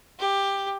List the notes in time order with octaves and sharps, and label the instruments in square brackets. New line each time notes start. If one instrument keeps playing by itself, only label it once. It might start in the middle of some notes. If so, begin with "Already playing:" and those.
[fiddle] G4